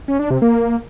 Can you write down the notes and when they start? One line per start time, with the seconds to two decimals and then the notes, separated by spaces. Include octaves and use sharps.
0.08 C#4
0.19 D4
0.31 C3
0.42 A#3